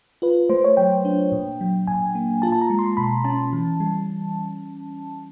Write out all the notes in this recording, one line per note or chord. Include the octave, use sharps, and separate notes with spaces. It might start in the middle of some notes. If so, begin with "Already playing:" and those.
F4 B4
A3 C5
C#5
F#3 G5
D4
A#2
F#3
A#2 G#5
A#3
F4 A5
A5
A#5
G#3
C6
B2 B5
C#4 A5
E3
G3